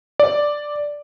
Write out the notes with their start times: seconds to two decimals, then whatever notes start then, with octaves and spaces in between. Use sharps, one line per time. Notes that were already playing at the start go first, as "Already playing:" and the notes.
0.20 D5